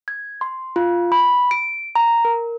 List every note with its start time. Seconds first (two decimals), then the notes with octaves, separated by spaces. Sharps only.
0.08 G#6
0.41 C6
0.76 F4
1.12 B5
1.51 D7
1.95 A#5
2.25 A#4